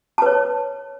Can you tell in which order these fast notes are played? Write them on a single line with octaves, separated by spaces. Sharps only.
A5 B4 C#5